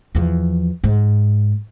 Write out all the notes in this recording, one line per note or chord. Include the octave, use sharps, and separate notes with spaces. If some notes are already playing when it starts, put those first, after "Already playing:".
E2 F3
G#2